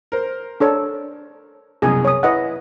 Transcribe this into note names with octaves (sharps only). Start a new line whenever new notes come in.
A#4 C5
D4 A4 C#5
C2 F#2 B2 G#4 G#5
C#5 D#6
E4 B4 D#5 F#5